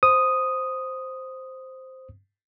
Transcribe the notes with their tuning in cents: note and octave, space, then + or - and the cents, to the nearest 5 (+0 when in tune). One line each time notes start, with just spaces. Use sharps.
C5 +0 D#6 +0